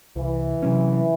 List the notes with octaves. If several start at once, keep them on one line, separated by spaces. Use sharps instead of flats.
C2 E3
C3 F#3 C#4